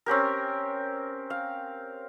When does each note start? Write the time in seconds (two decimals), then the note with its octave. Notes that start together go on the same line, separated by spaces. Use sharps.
0.06 C4 C#4 G4 A#4
1.30 F5